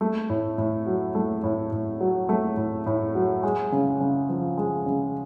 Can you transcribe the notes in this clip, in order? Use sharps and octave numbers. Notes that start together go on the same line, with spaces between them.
A3
A2
A2
F#3
A3
A2
A2
F#3
A3
A2
A2
F#3
G#3
C#3
C#3
F3
G#3
C#3